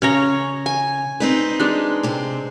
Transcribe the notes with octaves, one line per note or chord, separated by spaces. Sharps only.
C#3 C#4 C#5 A#5
G#5
C4 D#4 B4
G#3 D4
C3 C4